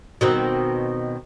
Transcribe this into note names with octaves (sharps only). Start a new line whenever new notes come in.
B2 D#3 C4